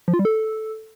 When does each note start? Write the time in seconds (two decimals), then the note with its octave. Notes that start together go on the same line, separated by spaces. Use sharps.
0.08 F3
0.14 F4
0.19 G3
0.25 A4